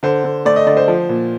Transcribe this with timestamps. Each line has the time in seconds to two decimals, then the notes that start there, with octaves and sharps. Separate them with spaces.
0.03 D3 C5
0.24 D3
0.45 A3 D5
0.56 D#5
0.66 D3 D5
0.77 C5
0.88 F3
1.09 A#2